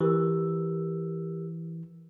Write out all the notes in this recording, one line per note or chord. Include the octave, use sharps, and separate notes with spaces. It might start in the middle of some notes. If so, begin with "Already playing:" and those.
E3 G4 A#4 E6